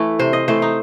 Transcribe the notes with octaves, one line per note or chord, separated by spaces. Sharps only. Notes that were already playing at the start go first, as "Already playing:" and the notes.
Already playing: E3 A3
C3 C5
D#5
E3 A3 C5
D#4